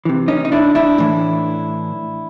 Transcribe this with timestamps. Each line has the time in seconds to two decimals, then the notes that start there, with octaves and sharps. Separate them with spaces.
0.05 C3 E3
0.28 C#4 D#4
0.45 D#4
0.52 D4 E4
0.75 D4 E4
0.98 A2 E3